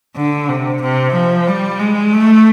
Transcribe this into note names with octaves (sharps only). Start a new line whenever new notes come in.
D3
C3
C3
F3
G3
G#3
A3